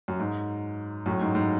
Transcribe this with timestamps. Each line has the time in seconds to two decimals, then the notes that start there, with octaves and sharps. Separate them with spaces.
0.08 F#2
0.20 G#2
1.06 F#2 A2
1.21 G#2
1.35 G#2